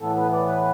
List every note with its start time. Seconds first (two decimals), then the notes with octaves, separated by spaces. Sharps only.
0.01 A2 E3 B3 A4
0.16 B4
0.32 D5
0.47 B4